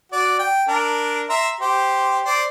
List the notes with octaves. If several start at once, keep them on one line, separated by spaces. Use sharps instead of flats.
F#4 D5
G5
D4 A#4
E5 A#5 C6
G4 C5
C5 D5 C6